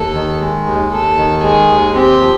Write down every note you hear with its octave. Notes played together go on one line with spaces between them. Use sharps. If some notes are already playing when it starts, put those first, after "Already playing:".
Already playing: D#2 A4
D#3
G#3
D#2
D#2 A4
D#3
G#3 G#4
D#2
C4 G4
F3